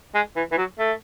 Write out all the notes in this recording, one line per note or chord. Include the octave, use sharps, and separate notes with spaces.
G#3
E3
E3
F#3
A3